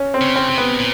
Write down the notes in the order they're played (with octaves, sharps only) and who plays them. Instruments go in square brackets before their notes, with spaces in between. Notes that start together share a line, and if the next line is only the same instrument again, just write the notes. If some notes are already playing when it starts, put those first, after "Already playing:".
Already playing: [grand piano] C#4
C4
[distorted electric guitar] C#3
[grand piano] C4
[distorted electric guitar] C3
[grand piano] B3
[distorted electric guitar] A#2